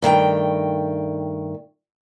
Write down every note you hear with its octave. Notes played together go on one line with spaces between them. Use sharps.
G2 D#3 A3 G5